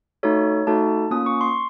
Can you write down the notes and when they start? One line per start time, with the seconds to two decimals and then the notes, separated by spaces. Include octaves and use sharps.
0.23 A3 D#4 F#4 A4 C#5
0.67 A3 D#4 F#4 A4 A5
1.11 A#3 C#4 F4 D#6
1.26 C#6
1.41 C6